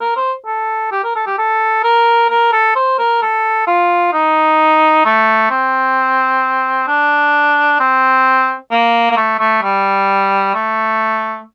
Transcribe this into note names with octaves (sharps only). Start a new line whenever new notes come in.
A#4
C5
A4
G4
A#4
A4
G4
A4
A#4
A#4
A4
C5
A#4
A4
F4
D#4
A3
C4
D4
C4
A#3
A#3
A3
A3
G3
A3